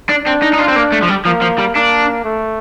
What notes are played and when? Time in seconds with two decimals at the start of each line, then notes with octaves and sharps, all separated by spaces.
0.09 D4
0.26 C4 D4
0.42 D#4
0.53 D#4
0.59 F4
0.68 C4
0.76 A#3
0.92 A3
1.02 F3
1.08 G3
1.25 F3 A#3
1.42 F3
1.59 G3
1.75 A#3 D4
2.24 A3